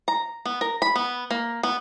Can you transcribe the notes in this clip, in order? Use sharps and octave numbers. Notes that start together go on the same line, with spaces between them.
A#5
B3
A#4
B5
B3
A#3
B3